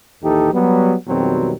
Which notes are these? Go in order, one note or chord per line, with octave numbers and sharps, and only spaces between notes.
A#1 D#2 E3 D#4 G4 A4
F#3 G3 B3
F2 B2 D#3 F#3 G3 C4